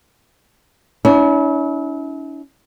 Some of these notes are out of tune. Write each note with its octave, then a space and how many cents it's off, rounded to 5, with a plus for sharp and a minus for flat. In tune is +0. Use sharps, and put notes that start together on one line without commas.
C#4 +40 E4 -35